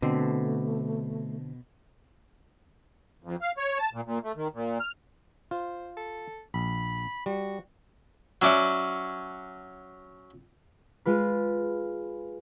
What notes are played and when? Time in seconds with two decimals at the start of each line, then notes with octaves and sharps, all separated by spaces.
0.02 B2 D3 A3 C4
3.23 F2
3.41 F5
3.57 C#5
3.78 A5
3.93 A#2
4.06 A#2
4.23 A3
4.36 D#3
4.54 A#2
4.80 F6
5.51 F4 C5
5.97 A4
6.54 A#1 B5
7.26 G3 F#4
8.42 F#3 C#4 D5 E5 F#5
11.06 G#3 F4 B4